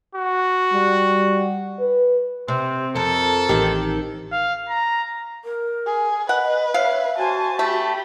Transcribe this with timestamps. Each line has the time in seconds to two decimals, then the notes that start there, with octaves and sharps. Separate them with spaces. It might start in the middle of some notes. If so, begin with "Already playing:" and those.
0.15 F#4
0.74 G3
1.79 B4
2.48 C3 C4
2.96 F2 A4 A#4
3.49 A1 D#3 C4 G4
4.32 F5
4.69 A#5
5.45 A#4
5.86 G#4
6.29 B4 D#5 F#5
6.74 C#5 E5 F5
7.18 F#4 C5 G#5 A5
7.59 A3 G4 B5